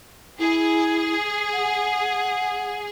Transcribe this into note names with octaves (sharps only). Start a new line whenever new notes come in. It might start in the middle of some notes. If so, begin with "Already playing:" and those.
E4 G#4
F#5